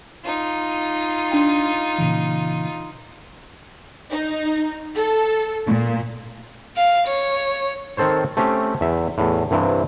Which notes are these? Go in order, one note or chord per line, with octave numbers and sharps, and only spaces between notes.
D#4 F4
D4 G5 C6
A#2 C#3 E3
D#4
A4
A#2
F5
C#5
D#3 C4 A4 C5 C#5
A3 C4 C#4 G4
E2 E5
E2 A2
C2 G2 C3 E3